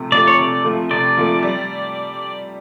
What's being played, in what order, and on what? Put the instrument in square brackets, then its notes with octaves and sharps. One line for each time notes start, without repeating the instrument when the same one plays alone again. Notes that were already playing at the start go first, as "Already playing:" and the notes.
Already playing: [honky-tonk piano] C3 F3 A3
[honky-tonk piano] F3 A3 [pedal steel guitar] D5
[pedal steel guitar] C#5
[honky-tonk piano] C3 [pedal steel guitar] D5
[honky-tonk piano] F3 A3
[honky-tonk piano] C3 [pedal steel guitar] D5
[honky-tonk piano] F3 A3
G3